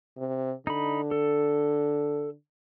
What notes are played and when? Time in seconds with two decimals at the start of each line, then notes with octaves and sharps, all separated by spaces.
0.17 C3
0.67 D3 D#4 B5
1.11 A4